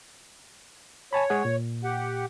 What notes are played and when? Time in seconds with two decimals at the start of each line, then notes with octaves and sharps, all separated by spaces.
1.13 C#5 G#5 A5 B5
1.30 G#3 G#4 F#5
1.45 A#2
1.84 G4 F#5